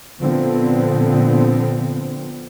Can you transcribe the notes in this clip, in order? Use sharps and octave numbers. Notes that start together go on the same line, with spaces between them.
A#2 D3 F3 B3 C4